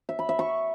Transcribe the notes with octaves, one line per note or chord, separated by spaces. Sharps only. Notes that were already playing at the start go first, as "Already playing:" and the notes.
E5
B5
E5
C#6